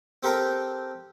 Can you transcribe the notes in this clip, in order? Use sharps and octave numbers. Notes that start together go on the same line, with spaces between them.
C4 G4 A4 A#4 G5 A#5